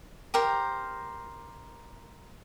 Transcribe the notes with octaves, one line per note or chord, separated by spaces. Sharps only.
G4 A#4 C5